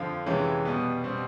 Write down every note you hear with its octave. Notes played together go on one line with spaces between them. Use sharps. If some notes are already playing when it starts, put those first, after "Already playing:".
Already playing: F2 D3 F3 F5
F2 C3 E3 G#3 C#4
B2 G3 B3
B2 G3 C4